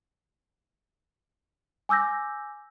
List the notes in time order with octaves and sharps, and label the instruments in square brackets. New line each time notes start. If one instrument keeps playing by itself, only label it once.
[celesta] G#5 D6 E6 G6 A#6